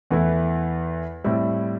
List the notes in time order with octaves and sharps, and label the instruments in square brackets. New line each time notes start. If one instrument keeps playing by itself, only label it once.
[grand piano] E2 E3 A3 E4
A2 G3 C4 E4